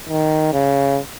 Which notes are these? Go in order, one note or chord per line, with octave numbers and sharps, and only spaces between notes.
D#3
C#3